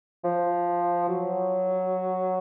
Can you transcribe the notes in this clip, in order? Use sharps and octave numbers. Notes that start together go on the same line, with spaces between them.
F3
F#3